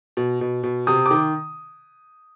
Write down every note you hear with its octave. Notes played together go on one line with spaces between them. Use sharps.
B2
B2
B2
C3 D#6
D#3 D6